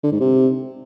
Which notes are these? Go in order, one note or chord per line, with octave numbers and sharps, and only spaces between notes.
D3
G#2
C3